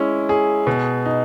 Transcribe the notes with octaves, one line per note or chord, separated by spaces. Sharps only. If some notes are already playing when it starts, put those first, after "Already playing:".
Already playing: G#3 C#4 E4
G#4
B2
D#4